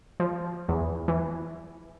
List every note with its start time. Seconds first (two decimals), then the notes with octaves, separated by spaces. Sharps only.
0.20 F3
0.69 E2
1.08 E3